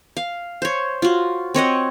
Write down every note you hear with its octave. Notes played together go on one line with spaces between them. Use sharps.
F5
C5 C#5
F4 F#4
C4 C#5 D#5 F#5